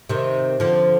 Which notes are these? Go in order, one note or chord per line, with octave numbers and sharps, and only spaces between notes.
C3 D#3
D3 F3